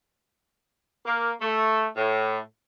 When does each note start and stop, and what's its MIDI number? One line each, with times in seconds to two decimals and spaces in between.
1.05 1.32 58
1.40 1.87 57
1.97 2.39 45